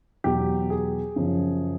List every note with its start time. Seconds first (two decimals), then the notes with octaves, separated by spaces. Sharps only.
0.24 E2 B2 F#3 G4
0.70 G#4
1.16 F#2 C#3 F3